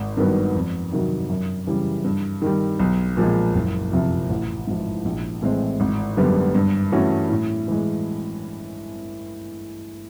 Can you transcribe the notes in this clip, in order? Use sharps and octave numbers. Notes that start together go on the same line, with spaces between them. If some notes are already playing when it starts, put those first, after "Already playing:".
Already playing: G#1
G2 D#3 F#3 B3
F2
C3 D#3 F#3
F#2
C#3 E3 G3
G2
D#3 G3
B1
A#2 F3 G#3
F#1
F2 C3 F3
A1
G#2 F3
A#1
A2 E3 G#3 C4
G#1
F#2 D3 G3 B3
G2
E3 A3 C#4 F#4
A2
E3 G#3